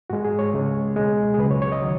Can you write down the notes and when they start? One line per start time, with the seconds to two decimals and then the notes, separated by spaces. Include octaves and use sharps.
0.10 G#2 G#3 F#4
0.25 G#4
0.39 C#5
0.53 C#2 C#3 G#3
0.96 C#2 B2 G#3
1.34 G#4
1.39 C#2 C#3 F#3 B4
1.51 C#5
1.62 C#5
1.72 D#5
1.82 D#3 F#3